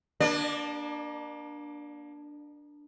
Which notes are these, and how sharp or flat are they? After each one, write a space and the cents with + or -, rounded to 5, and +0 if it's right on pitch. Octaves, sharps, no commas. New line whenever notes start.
A#3 +30 D4 +0 D5 +40